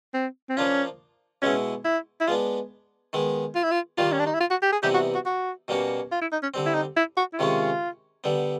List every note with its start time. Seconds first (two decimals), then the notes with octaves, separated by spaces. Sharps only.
0.14 C4
0.49 C4
0.57 F3 A#3 C#4 D4 F4
1.42 B2 G#3 B3 C#4 E4
1.85 E4
2.21 E4
2.27 G#3 B3 D4 F4
3.13 D#3 G#3 B3
3.55 F4
3.63 E4
3.71 F4
3.98 D#3 G3 A#3 F4
4.12 C#4
4.19 D4
4.26 D#4
4.34 E4
4.40 F4
4.51 F#4
4.62 G4
4.72 G#4
4.83 C3 E3 G3 B3 D#4 G4
4.94 F#4
5.14 F#4
5.25 F#4
5.68 B2 G3 A#3 C#4 F#4
6.11 F4
6.22 E4
6.32 D#4
6.43 C#4
6.54 D3 G3 C4
6.66 E4
6.74 D#4
6.97 E4
7.17 F#4
7.33 E4
7.38 C3 D#3 G#3 C#4 F4
8.24 D3 G3 B3